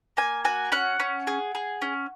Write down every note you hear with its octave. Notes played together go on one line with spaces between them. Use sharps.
A#3 G#5
F#4 G#5
C#4 F#5
C#4
G#4
G#4
C#4